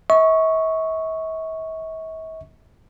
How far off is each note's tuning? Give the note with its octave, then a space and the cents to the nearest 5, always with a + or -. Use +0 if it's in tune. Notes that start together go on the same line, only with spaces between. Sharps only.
E5 -45 C#6 +0